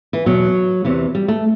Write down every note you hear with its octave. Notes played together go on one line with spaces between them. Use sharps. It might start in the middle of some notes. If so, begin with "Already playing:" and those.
E3
E2 B2 F#3
E2 C3 E3
G3
A3